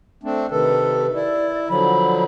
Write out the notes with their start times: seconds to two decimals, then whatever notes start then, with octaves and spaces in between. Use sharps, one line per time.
0.23 A3 C4 D4
0.51 C3 D#3 A4 B4
1.14 E4 D5
1.69 D3 F3 F#3 B5